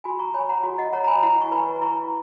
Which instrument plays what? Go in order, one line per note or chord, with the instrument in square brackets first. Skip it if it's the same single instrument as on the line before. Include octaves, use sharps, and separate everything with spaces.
[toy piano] F#4 G#5 B5
A#5 C#6
C#5 G#5 B5
F#5 A#5
F#4
D#5 F#5
C#5 F#5 A#5
A#5
G#5 B5
E4 F#5 A#5
C#6
B4 G#5 B5
B5
E4 A#5 C#6